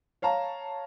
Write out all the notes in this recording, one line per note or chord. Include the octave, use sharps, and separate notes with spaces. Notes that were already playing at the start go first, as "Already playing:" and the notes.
C#5 F5 A5 A#5